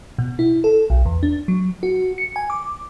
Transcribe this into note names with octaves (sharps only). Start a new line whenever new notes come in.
B2
E4
A4
B1
E2
D4
F#3
F#4
C#7
G#5
D6